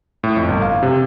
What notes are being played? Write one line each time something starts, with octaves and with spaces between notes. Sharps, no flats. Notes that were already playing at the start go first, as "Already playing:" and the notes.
A2
F2
G1
F5
C3